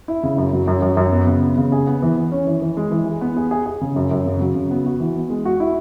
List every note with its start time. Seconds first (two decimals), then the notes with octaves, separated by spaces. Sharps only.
0.08 E4
0.23 C#3
0.38 F#2
0.53 F#3
0.67 F#2
0.82 F#2
0.97 F#2
1.12 B3
1.27 C#3
1.42 B3
1.57 C#3
1.72 G#4
1.87 B3
2.02 E3
2.17 E3
2.32 C#4
2.47 E3
2.62 E3
2.77 G#3
2.91 E3
3.06 G#4
3.21 B3
3.37 G#4
3.51 G#4
3.66 G#4
3.81 C#3
3.96 F#2
4.11 F#2
4.26 C#3
4.41 F#3
4.55 C#3
4.71 B3
4.86 F#4
5.00 E3
5.15 B3
5.30 G#3
5.45 F#4
5.60 E4